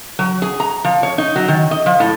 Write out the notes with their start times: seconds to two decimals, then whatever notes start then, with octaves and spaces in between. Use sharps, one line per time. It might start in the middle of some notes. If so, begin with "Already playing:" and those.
0.19 F#3
0.42 G#4
0.60 A#5
0.84 F3
1.03 C#5
1.18 D#4
1.36 F#3
1.48 D#3
1.71 D#5
1.86 F3
2.00 A2